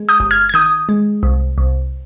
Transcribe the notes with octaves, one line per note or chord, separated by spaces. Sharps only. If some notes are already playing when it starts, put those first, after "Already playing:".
Already playing: G#3
D#6 G6
G1
F6 G#6
G#6
D#3 D#6 G6
G#3
C2
C2